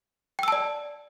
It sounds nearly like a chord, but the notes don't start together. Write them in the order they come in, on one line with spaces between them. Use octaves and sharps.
G5 E6 A5 D5